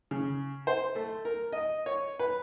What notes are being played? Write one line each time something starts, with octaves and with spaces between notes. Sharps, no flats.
C#3
C5
A3
A#4
D#5
C#5
B4